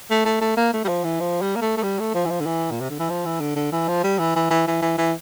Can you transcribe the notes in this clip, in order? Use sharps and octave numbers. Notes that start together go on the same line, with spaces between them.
A3
A3
A3
A#3
A3
G3
F3
E3
F3
G3
A#3
A3
A3
G3
A3
F3
E3
F3
D3
E3
A#2
C3
D3
E3
F3
E3
D3
D3
E3
F3
G3
E3
E3
E3
E3
E3
E3